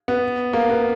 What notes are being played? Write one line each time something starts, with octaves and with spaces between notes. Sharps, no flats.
B3
A#3
B3